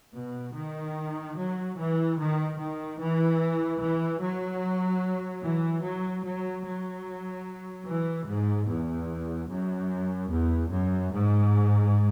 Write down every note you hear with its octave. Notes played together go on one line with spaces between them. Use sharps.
B2
D#3
F#3
E3
D#3
D#3
E3
E3
F#3
E3
F#3
F#3
F#3
E3
G#2
E2
F#2
E2
F#2
G#2